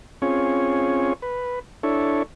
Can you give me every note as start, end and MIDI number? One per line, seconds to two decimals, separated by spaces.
0.22 1.13 60
0.22 1.13 61
0.22 1.13 65
0.22 1.13 68
0.22 1.13 73
1.22 1.59 71
1.83 2.23 62
1.83 2.23 64
1.83 2.23 69
1.83 2.23 73